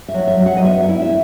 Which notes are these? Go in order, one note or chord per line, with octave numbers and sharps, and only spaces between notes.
E5
F#3
E5
F#3
F#5
D#5
B3 E5
E5
E4
E5